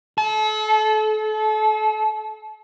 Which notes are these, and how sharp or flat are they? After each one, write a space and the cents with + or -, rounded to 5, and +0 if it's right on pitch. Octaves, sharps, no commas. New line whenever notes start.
A4 -35